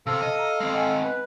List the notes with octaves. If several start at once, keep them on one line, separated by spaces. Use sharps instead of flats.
C3 A4 C5 F5 E6
D#5
A#5
G#3 C4
D#5 F#5 G#5
B4